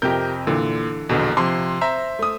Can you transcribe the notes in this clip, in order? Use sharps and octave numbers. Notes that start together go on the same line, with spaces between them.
F2 C3 G4 A#4 G6
A#2 D3 E3
A#1 E2 B2 D3
C3 F3 C6
C5 E5 A#5
A3 D#6